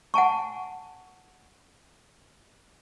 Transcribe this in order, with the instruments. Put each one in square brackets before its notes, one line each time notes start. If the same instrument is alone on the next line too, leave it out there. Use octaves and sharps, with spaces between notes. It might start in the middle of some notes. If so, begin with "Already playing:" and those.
[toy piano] F#5 G#5 A5 C#6